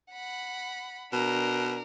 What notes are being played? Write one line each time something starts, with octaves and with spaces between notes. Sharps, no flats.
F#5 B5
B2 D4 A#4